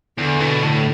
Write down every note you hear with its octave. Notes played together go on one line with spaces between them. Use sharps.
E2 D3
B2
A2 D3